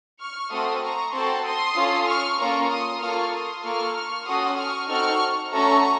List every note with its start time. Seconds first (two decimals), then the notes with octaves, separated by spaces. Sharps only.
0.20 C#6 F6
0.52 A3 C4 F#4 A4 C6 D#6
0.83 A#5 C#6
1.14 C4 F#4 A4 A5 C6
1.46 C6 D#6
1.77 C#4 F4 A4
2.08 C#6 F6
2.39 A#3 C#4 F4 A4 A#5 C#6
2.70 C6 D#6
3.01 A#3 F4 A4 C#6 F6
3.33 C6 D#6
3.64 A#3 F4 A4 C#6 F6
3.95 C#6 F6
4.27 C#4 F#4 A4 C6 D#6
4.58 C#6 F6
4.89 C4 D#4 F#4 A4 C#6 F6
5.52 A3 C#4 F#4 A4 A#5 C#6